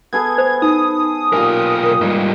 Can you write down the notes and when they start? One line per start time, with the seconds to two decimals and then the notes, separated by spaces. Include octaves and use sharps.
0.13 B3 G#4 A4 G#6
0.38 C5
0.62 D#4 D#6
1.33 B1 A#2 G4 A#4 G#5
2.01 G#2 G3